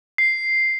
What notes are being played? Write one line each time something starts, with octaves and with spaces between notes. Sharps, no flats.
C7